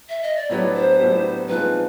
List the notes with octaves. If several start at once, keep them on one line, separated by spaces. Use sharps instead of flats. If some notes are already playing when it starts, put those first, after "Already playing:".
E5
D#5
D5
A2 F#3 B3 D4 G4 C#5
C5
A2 F#3 B3 D4 G4
A#2 F3 G#3 C4 D#4 B4